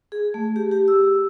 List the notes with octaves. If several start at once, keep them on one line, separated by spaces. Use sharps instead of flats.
G#4
A3
G4
G4
E6